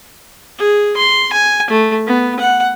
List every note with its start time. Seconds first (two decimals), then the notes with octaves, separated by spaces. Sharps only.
0.58 G#4
0.97 C6
1.33 G#5
1.70 A3
2.07 B3
2.40 F#5